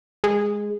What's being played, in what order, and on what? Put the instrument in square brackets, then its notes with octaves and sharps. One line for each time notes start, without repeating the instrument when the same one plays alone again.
[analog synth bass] G#3